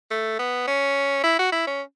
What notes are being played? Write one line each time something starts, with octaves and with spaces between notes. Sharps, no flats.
A3
B3
C#4
E4
F#4
E4
C#4